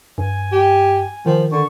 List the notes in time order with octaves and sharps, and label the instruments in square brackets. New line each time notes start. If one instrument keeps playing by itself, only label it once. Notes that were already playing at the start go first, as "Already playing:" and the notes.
[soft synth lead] G2 [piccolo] G#5
[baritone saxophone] G4
[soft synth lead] D#3 [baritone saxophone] F3
[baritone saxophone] D3 [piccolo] C#6